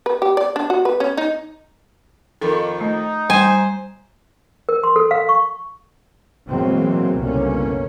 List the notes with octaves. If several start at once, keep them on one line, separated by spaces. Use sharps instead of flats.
B4
G4
D5
D4
F#4
B4
C#4
D#4
F2 D#3 A4 A#4
A3 D#4
G3 C5 G#5
A#4
C6
A4
F5
C#6
B2 E3 F#3 G#3 A#3 C4
F#1 C2 B2 D3 A#3 C#4